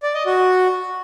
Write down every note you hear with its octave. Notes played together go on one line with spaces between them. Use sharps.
D5
D#5
F#4